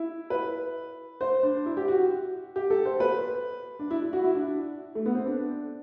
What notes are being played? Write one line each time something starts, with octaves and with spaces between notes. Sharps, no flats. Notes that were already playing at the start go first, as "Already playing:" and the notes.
Already playing: E4
B4
C5
D4
E4
G4
F#4
G4
A4
C5
B4
D4
E4
E4
F#4
E4
D4
A3
B3
C4
D4